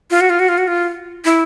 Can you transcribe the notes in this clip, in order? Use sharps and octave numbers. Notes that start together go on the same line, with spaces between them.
F4
F#4
F4
F#4
F4
F#4
F4
E4